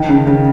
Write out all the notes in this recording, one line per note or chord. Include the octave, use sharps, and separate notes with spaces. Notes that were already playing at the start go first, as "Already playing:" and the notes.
Already playing: D#3
C#3
C#3